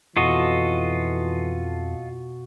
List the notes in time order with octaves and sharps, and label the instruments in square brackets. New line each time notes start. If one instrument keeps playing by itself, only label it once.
[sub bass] F2 [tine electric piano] B2 F#4 C#6 [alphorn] E3 [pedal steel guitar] F4 A4 D#5